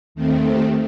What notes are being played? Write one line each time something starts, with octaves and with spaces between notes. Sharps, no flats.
D#2 D#3 A3 C4
G4